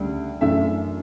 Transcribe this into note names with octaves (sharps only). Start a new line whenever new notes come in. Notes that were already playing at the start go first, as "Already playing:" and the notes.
Already playing: D2 C#3 G3 D4
F#2 E3 A3 D4 E5